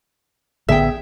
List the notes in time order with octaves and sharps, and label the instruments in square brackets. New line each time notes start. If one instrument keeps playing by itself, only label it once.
[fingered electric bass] A1 D3 B3 [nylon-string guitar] G#4 G5 [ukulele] E5